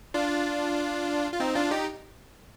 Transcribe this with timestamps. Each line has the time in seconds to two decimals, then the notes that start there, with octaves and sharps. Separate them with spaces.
0.14 D4 F4
1.33 F4
1.40 C4 D#4
1.55 D4 F4
1.71 D#4 G4